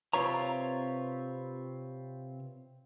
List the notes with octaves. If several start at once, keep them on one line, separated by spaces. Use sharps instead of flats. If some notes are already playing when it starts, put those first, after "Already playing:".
C3 C4 F4 B4 C#5 A#5